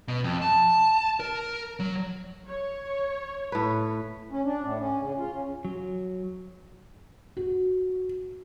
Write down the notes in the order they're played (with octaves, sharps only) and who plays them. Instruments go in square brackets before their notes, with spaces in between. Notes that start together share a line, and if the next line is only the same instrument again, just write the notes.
[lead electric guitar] B2
F2
A5
A#4
F#3
[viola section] C#5
[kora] A2 B4
[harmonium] C#4
D4
A2
C#4
C#3
F4
C#4
[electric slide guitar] F#3
[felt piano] F#4